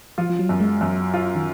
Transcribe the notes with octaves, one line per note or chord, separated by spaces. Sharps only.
F3 F4
F3
F#3
F#2
G#3
F#2 F#3
F4
D#3